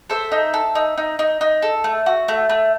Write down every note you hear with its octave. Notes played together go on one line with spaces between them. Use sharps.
A4 C5 E5
D#4
A4
D#4
D#4
D#4
D#4
A4
A3
F#4
A3
A3